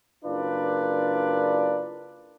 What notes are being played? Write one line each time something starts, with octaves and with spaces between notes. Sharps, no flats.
F#1 D4 F4 A#4 B4 D5